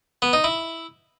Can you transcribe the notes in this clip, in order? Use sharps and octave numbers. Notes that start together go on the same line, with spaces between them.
B3
D#4
E4